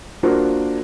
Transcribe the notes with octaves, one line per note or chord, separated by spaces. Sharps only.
A#3 D4 F4 F#4 A#4 C5